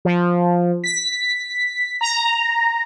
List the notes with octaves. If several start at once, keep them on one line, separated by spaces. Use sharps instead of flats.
F3
B6
A#5